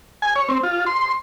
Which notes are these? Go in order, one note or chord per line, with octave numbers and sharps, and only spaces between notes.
G#5
C#5
C4
F4
C6